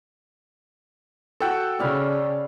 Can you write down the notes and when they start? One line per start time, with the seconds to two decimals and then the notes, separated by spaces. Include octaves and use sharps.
1.40 F#4 A4 F#5 G5 E6
1.79 C#3 D5 F5 B5